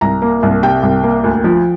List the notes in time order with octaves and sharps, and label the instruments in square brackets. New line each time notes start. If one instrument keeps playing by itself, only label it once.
[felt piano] C2 A#5
A#3
C2
C3 G5
C2
A#3
D2
F3